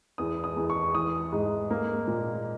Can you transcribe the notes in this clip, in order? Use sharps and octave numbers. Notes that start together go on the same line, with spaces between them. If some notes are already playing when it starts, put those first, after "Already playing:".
E2 D#6
D#6
E2
C#6
E3 D#6
G#2
A#3
A#2